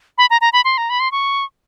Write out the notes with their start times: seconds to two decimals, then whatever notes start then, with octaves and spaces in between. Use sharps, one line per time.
0.18 B5
0.30 A#5
0.41 A#5
0.53 B5
0.65 C6
0.78 A#5
0.90 B5
1.00 C6
1.12 C#6